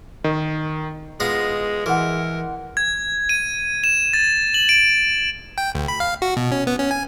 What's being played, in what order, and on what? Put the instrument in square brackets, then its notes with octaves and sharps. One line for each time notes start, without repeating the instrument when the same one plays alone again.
[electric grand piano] D#3
[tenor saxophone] G#3 [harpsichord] B3 F4 D#5
[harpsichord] E3 [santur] G#3 F#5 [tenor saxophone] A#4
[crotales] G#6
D#7
E7
A6
F#7
D7
[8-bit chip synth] G5
D2
B5
F5
F#4
B2
C#4
B3
C#4
G#5